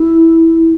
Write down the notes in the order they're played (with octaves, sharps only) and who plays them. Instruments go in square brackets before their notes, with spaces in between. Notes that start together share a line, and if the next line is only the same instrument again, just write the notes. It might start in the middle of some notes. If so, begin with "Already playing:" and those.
Already playing: [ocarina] E4